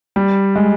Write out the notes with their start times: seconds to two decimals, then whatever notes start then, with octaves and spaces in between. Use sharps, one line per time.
0.16 G3
0.56 G#3